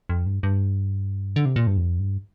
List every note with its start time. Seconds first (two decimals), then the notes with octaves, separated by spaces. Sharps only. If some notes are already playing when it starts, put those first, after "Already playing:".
0.09 F2
0.26 G2
0.43 G2
1.36 D3
1.45 C3
1.56 A#2
1.67 G2
1.77 F2
2.00 G2